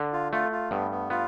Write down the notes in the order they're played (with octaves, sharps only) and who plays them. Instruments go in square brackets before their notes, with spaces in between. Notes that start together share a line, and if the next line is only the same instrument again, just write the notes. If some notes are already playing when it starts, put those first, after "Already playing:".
Already playing: [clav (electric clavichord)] D3
[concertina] F4
[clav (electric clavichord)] A3 [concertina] F4
[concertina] F4
[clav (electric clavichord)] G2 [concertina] B3
[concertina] B3
[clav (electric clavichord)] B3 [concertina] F4